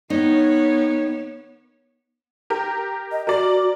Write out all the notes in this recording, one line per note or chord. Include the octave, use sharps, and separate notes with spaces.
D#3 B3 D#4 C#5
G4 A#4
D#5
F#4 A#4 D5